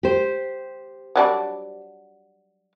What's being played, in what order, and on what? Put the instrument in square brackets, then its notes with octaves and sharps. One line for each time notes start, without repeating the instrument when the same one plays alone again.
[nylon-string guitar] G4 C5
[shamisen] F#3 G3 D4